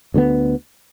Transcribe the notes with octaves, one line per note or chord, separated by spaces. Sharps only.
D2 D3 G3 B3